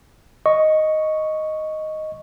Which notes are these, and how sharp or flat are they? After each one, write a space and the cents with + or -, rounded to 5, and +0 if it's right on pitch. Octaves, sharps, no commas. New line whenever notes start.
D#5 +0 C#6 +0